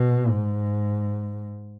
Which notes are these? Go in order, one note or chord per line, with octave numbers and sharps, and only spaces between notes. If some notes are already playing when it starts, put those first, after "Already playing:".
Already playing: B2
G#2